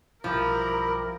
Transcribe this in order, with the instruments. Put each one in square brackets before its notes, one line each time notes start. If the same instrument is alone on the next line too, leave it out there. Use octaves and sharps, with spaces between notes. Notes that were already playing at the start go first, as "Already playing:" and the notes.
[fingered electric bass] B1 G2 [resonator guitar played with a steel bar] F3 [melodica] E4 G4 B5 [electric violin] A#4